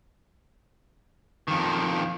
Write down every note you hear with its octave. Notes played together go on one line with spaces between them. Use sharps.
F2 D#3